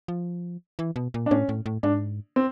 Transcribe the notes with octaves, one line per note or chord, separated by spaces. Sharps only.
F3
E3
B2
A#2
D4
A2 C#4
A2
A2
G#2 D4
C4